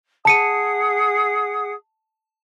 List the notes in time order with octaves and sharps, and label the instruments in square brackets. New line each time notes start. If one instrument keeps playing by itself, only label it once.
[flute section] G#4 F#5 D#6 [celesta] A5 C#7 D#7